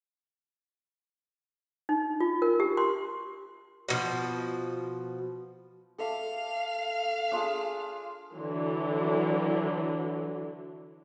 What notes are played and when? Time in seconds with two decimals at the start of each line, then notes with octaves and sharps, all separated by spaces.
1.89 D#4
2.20 F4
2.42 A#4
2.60 G4
2.77 C6
3.88 B2 D3 F3
5.98 A4 E5 F5 D6
7.32 D4 F4 G#4
8.34 D3 E3 F#3